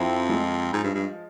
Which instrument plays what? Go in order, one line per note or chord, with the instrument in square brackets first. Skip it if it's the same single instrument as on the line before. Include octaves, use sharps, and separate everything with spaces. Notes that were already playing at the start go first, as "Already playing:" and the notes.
Already playing: [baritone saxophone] F2 [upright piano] C4 E4
[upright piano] F3 G#3
[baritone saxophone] G#2
G2
G2